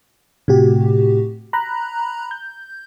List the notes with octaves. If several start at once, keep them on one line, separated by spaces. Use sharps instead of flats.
A2 C3 F#4 G4
A#5 B5 F#6
G6